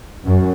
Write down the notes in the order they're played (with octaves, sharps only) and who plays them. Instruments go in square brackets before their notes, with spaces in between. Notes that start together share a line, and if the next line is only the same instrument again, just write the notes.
[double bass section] F#2